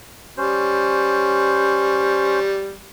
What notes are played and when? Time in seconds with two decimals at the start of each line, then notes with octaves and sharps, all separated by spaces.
0.38 G3 C#4 C5